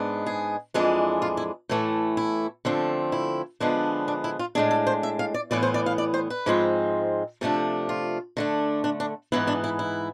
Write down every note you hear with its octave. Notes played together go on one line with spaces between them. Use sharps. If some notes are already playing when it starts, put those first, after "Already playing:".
Already playing: G#2 G#3 B3 D4
G#4
F2 E3 G#3 D4
F4
E4
A2 E3 A3
E4
D3 F3 A3 C4
E4
D3 F3 G#3 B3 D4
D4
E4
F4
A2 G#3 D4 G#4
A4
C5
E5
F5
D5
A2 E3 B3 D5
C5
D5
F5
D5
C5
B4
G#2 F3 G#3 C4
C3 F3 A3 D4 A4
F4
D3 A3 D4
D4
D4
G#2 E3 B3 E4
D4
E4
E4